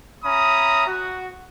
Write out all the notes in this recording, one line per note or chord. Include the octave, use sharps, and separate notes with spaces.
C#4 E5 A#5 B5 D#6
F#4